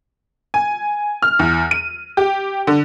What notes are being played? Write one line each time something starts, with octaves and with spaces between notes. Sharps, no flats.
G#5
F6
E2
D#7
G4
D3